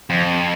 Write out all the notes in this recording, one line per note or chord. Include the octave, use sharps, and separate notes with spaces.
F2